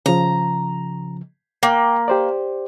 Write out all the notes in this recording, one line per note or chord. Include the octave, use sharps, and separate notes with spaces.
C#3 F3 A#5
A#3 G5
G4 C5 D5